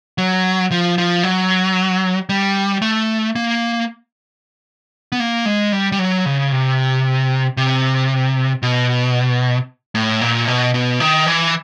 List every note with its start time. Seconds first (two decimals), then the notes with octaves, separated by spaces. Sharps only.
0.18 F#3
0.71 F3
0.98 F3
1.23 F#3
2.29 G3
2.82 A3
3.36 A#3
5.12 B3
5.20 A#3
5.46 G#3
5.72 G3
5.92 G3
5.99 F#3
6.26 C#3
6.52 C3
7.57 C3
8.63 B2
9.95 A2
10.21 A#2
10.47 B2
10.74 B2
11.00 D#3
11.26 E3